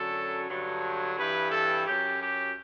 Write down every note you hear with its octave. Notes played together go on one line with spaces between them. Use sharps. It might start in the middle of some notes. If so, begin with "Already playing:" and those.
Already playing: F#2 D3 F#3 A4
G2 D3 F#3
G2 E3 G3 B4
A4
F#2 F#3 G4
G4